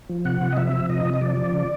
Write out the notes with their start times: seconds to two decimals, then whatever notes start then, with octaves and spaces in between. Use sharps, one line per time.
0.10 F3
0.25 C3 F#5
0.41 C3
0.52 D#5
0.57 F3 E5
0.73 F3
0.89 C3 D#5
1.05 C3
1.14 D#5
1.21 F3 D5
1.37 F3
1.53 C#3